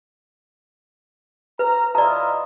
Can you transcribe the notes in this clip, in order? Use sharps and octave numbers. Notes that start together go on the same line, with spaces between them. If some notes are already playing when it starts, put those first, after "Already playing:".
B4 A#5
E4 F4 D5 D#5 A#5